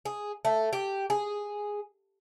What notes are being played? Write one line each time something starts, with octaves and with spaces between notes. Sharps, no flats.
G#4
A3
G4
G#4